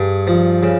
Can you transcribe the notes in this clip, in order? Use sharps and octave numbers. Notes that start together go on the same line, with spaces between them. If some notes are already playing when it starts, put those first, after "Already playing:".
Already playing: G2 G#4
F3
C#3